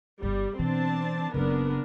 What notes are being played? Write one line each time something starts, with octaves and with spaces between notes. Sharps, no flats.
G1 D3 G3
B2 E3 C4 D4 A5
F#1 C#3 F#3 B3 D4 A#4